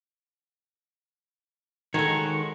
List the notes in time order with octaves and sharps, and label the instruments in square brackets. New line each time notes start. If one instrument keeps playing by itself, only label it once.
[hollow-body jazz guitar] D#3 A4 [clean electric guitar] G#3 F#4 C#5